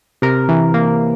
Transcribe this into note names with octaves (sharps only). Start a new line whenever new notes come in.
C3 A#4
E3
A#3